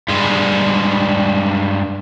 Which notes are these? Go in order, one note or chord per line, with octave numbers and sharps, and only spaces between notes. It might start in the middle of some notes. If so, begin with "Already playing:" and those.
G2 G#3